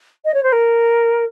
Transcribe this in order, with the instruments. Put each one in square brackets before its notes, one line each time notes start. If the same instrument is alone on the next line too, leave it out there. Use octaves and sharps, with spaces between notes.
[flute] D#5
C#5
C5
A#4